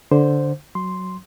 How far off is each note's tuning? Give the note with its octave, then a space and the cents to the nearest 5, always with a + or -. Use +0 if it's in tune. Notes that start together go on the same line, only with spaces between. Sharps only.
D3 -5 C5 +0
F#3 +0 C6 +0